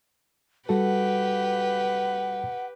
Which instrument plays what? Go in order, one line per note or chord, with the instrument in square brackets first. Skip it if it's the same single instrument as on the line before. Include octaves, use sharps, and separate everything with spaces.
[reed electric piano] G3 F#4 A4 [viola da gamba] G4 B4 [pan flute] F#5